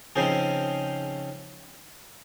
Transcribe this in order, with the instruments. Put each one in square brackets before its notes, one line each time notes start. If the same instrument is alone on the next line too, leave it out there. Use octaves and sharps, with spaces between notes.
[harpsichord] C#3 F3 C4 D#4 G#4 C5